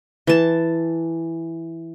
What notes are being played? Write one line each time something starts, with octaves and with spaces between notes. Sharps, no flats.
E3 A5